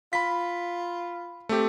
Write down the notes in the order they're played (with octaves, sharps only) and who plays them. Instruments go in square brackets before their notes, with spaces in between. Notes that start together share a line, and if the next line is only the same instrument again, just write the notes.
[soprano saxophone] F4 [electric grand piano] B5 B6
[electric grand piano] A3 C4 G4